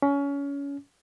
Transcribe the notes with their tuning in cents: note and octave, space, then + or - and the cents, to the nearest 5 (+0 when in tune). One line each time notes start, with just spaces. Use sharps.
C#4 +25